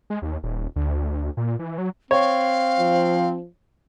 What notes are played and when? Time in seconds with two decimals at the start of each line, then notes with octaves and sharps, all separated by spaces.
0.10 G#3
0.22 D#2
0.43 D#1
0.76 D2
1.37 A#2
1.59 E3
1.78 F#3
2.11 C4 C#5 F5
2.80 F3